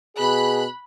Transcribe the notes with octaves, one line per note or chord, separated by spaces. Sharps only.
B2 G#4 B5 F#6